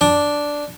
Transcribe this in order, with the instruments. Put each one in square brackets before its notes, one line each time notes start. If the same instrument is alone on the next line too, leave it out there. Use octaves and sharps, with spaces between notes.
[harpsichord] D4